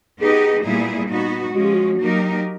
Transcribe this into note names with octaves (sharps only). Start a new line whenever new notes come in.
B3 D#4 G4 G#4 B4 D#5
A#2 G3 B3 E4 G#4
B3 D#4 F#4
F3 G#3 C#4 F#4
G4
F#4
F#3 A#3 D#4 G4 A#4